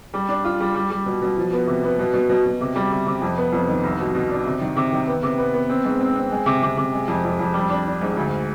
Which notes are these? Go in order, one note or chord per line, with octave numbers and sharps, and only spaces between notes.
G3
D4
F4
G3
G3
G3
B2
B2
F3
B3
C3
B3
B2
B2
B2
B2
C3
G3
C3
C3
F2
B3
F2
D#3
C2
B2
B2
D4
C3
D#3
C3
D#3
B3
C3
B3
B3
C4
G#2
C4
C4
G#3
C3
C3
C3
G#3
F2
F2
F2
G3
D4
D4
G#2
D2